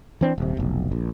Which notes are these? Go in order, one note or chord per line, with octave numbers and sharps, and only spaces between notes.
E3 C4 D4
D#1 C3
F1 B1
A#1